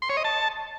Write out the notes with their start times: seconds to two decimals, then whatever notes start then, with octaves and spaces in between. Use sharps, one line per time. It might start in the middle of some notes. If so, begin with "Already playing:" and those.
0.02 C6
0.09 C#5
0.17 D#5
0.24 A5